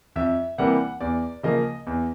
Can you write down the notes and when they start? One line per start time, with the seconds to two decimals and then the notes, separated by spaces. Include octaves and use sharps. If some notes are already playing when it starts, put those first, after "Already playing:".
0.16 F2 E5
0.58 C3 E3 G3 A#3 F#5
1.00 E2 D5
1.43 C#3 F3 A#3 D#5
1.87 E2